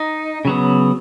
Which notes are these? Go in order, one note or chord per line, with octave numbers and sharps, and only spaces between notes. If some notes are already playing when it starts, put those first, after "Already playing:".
Already playing: D#4
C#3 F#3 B3